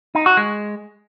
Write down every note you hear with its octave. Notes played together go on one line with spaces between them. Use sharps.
D#4
F#4
G#3